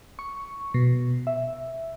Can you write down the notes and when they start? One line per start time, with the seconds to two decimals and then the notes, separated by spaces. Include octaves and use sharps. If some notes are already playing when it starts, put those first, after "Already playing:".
0.19 C#6
0.74 B2
1.27 E5